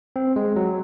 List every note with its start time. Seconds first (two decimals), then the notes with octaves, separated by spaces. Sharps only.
0.16 C4
0.36 G#3
0.56 F#3